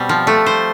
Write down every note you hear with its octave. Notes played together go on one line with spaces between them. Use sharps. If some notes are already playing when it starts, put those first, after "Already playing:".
Already playing: B2 G3 C4
F3
A3
C5